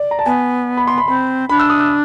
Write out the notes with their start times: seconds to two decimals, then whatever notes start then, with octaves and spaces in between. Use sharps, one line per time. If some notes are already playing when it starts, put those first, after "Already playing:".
Already playing: D5
0.11 A#5
0.19 A5
0.26 B3 G#5
0.77 B5
0.87 C6
0.98 B5
1.08 C4 B5
1.49 D4 B5
1.59 E6
1.70 D#6
1.80 E6